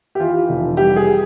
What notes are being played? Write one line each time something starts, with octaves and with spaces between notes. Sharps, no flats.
G4
E3 F4
F1
G3 G4
G#4